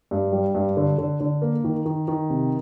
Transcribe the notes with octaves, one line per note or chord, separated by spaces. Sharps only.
G2
G3
G2
D3
D3
D3
A#3
D#3
D#3
D#3
C3